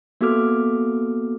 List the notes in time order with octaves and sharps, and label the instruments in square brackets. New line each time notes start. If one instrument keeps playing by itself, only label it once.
[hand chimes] A#3 B3 F#4 A4 D6 F6